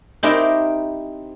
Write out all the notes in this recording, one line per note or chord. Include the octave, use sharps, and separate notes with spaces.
C4 D#4 E4 G4 A#4